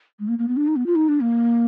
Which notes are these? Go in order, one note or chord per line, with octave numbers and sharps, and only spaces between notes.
G#3
A#3
A#3
B3
D4
D#4
B3
F4
D#4
D4
A#3